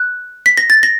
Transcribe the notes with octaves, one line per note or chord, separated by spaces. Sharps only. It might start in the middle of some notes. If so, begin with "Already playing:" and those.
Already playing: F#6
B6
A#6
A6
A#6